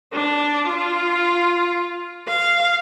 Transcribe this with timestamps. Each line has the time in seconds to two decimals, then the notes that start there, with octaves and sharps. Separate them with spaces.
0.14 D4
0.68 F4
2.27 F5